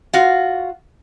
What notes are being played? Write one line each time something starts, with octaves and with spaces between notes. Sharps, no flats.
F4 F#4